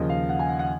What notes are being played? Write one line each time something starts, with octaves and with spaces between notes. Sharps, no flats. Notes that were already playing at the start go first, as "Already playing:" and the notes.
Already playing: D#2 C#3 F3 D#5
F5
F#5
G#5
F#5
F#5